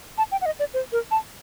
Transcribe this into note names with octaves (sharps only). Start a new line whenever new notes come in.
A5
G5
F#5
D#5
D5
C5
A#4
A5